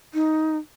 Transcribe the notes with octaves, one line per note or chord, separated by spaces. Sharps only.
D#4